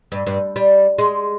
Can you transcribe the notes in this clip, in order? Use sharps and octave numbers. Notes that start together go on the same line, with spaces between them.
G2
G2
G3
G#3